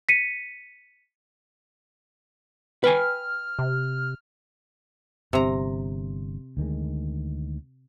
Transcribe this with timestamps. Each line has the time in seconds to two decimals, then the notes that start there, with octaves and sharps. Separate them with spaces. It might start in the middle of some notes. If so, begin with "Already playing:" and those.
0.09 B6 C#7 D#7
2.84 B4 G5 G#5 F6
3.59 C3
5.33 G1 C3 A#5
6.57 D2 D#3 G#3